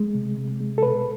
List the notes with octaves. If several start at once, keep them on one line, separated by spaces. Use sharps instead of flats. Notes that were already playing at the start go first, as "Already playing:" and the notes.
Already playing: G#3
C3
C3
G#3
A4
B2 B4